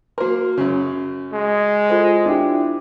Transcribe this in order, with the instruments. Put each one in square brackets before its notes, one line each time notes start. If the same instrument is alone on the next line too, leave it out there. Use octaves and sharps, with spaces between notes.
[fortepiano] A#3 A#4 [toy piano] F#4 C6
[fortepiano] F#2 C#3
[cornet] G#3
[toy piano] F4 A4 C5
[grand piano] D4 E4 G4